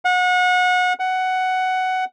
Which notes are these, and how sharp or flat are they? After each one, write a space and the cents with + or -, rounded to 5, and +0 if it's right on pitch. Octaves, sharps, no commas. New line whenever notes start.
F#5 -30
F#5 +10